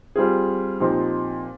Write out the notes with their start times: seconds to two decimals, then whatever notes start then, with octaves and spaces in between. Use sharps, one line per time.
0.16 G3 C4 F4 G#4
0.80 A#2 F3 C4 D#4 G4